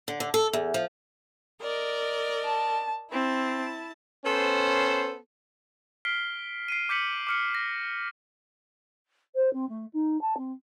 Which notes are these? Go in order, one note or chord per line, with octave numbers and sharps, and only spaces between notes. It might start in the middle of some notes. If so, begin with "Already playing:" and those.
D3
D3
A4
E2
F3
A#4 D5 D#5
A5
C4 E4 A5
B3 C#4 A4 C5
F6 B6 C7 D7 G7
C7 D7 D#7
D6 G6 B6 C#7 F#7
D6 F6 C#7
A#6
C5
C4
A3
D#4
A5
C4